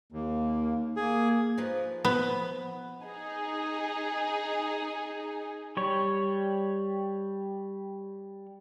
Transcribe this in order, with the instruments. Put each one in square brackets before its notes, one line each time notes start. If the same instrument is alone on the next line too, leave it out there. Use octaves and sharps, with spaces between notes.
[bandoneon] D#2 [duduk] A#3
[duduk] A#3 [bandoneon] G#4
[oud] F3 D#4 B4
[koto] B3
[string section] D#4 G#4
[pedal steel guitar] G3 C#5